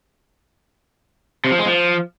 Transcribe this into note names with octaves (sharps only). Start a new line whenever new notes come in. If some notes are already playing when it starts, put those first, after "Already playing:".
C3
F3
G#3
F3